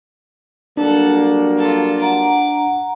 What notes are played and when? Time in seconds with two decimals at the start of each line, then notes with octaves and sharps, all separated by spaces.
0.77 F#3 G3 A#3 D4 A4 F#5
1.58 F4 A4
2.02 F#5 A#5 D6